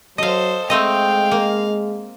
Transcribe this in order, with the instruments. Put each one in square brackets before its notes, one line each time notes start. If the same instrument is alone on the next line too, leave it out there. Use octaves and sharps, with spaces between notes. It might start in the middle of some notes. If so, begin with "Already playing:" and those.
[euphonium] F#3 [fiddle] A4 C5 [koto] D#5 F5
[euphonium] G#3 [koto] A3 C4 D#5 [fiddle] F5 [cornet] G5
[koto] A#3